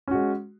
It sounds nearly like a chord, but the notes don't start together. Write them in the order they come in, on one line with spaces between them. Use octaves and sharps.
C#4 F#4 G#3